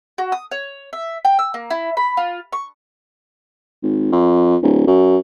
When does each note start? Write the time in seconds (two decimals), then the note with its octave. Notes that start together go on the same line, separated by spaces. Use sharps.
0.18 F#4
0.32 D#6
0.51 C#5
0.93 E5
1.25 G5
1.39 E6
1.54 A#3
1.70 E4
1.97 B5
2.17 F4
2.53 C#6
3.83 G#1
4.12 F2
4.62 D1
4.87 F#2